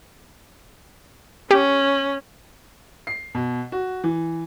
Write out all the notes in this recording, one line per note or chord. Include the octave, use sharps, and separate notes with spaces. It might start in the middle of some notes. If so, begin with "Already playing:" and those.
C#4 G4
C7
B2
F#4
E3